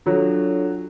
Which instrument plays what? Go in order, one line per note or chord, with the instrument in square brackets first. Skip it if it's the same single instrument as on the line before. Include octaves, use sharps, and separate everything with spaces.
[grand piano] F#3 [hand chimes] D4 F4 A4 C#5